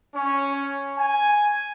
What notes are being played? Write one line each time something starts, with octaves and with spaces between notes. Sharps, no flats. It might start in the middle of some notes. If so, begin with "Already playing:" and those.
C#4
G#5